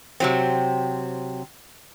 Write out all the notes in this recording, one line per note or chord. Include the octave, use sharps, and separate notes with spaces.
C3 F#3 C4